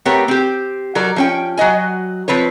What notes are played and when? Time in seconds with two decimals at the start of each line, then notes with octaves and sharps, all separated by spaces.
0.05 A3 B3 C4 G4 A#4 C#5
0.28 C4 G4
0.95 F#3 A4 A#4 D5
1.16 F3 C#4 G5
1.57 F#3 F#4 D#5 G#5
2.28 F3 C4 B4 C#5